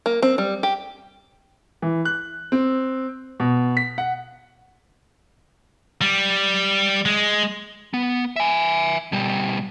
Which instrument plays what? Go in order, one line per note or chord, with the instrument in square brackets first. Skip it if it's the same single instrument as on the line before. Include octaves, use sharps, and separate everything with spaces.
[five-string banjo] A#3
C4
G3
G4
[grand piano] E3
F#6
C4
B2
B6
F#5
[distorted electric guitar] G3
G#3
[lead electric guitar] B3
E5 G#5
B2 G3